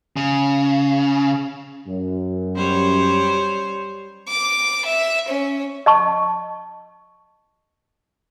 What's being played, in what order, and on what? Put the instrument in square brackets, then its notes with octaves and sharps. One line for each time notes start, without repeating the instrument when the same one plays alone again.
[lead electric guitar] C#3
[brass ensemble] F#2
[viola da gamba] G3 C5 C#5
[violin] D6
E5
C#4
[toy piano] D#5 A5 C#6